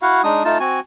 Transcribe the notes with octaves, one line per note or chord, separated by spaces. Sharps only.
E4 F#4 F5 F#5
G#3 D4 D#4 D#6
A3 D#4 F4 A5
C4 F#4 G#5